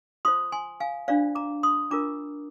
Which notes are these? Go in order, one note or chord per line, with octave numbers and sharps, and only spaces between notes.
F4 C5 C6 D#6
G#5 C6
F5 G#5
D4 F4 C5 D5 F5
A#5 D6
C6 D#6
D4 F4 A#4 A#5 D6